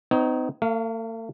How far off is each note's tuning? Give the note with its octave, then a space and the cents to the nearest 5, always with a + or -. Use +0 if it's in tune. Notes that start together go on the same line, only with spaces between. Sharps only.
C4 -45 D#4 +0 C#5 +0
A3 +45 F5 +0